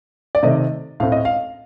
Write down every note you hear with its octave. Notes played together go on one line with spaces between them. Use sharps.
D5
C3 D#3 A3 D#5
A2 A3 C4 F5
D#5
F5